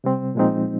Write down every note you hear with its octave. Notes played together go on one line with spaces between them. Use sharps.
C3 G3 C4
A#2 F3 G#3 C4 D#4